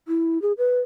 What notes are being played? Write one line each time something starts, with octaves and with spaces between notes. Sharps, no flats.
E4
G#4
B4